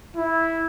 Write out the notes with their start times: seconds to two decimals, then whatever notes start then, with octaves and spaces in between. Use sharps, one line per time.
0.17 E4